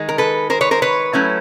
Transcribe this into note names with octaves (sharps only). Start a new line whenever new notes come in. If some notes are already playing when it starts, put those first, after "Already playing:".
Already playing: D#3 G#3
A#4
A4 B4
A#4 C5
B4 C#5
A#4 C5
B4 C#5
F#3 A3 C#4 E4